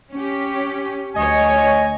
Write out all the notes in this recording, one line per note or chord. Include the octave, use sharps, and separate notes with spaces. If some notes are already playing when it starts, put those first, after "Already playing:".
C#4 G4
D2 C#5 D#5 G#5